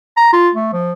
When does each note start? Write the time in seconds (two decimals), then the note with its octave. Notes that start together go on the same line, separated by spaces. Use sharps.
0.17 A#5
0.33 F4
0.54 A3
0.73 F3